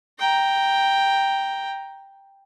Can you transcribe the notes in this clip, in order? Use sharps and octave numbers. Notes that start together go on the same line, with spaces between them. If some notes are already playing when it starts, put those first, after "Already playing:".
G5 A#5